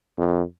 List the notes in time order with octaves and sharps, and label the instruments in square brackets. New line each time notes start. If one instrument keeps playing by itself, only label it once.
[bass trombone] F2